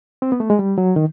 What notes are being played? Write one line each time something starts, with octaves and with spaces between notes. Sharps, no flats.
C4
B3
A3
G#3
G3
F#3
D#3